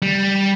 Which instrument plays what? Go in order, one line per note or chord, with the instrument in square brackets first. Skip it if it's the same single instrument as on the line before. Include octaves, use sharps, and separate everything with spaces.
[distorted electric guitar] G3